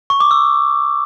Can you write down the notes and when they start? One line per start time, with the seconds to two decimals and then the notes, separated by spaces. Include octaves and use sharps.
0.10 C#6
0.20 D6
0.31 E6